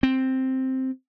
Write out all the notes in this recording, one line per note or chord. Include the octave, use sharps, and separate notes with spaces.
C4